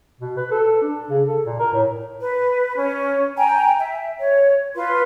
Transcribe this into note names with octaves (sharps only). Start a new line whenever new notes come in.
B2
B4
A4
D4
C#3
A4
A#2
A#4
A2
B4
C#4
G5 G#5 A#5
E5
C#5
F4 B4 C6